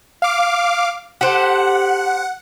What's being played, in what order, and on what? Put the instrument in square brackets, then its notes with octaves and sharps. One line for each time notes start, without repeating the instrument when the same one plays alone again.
[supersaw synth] F5 D6
[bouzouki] G4 A4 C5 [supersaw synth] F#5